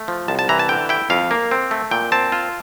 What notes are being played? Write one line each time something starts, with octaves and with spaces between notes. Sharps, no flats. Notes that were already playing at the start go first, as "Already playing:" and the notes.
Already playing: A3
F3
C2 A5
A5
E3 A#5
A5
D3 G5
E4 G5
F2 F5
A#3
C4
A3
A#2 G5
C4 A5
F4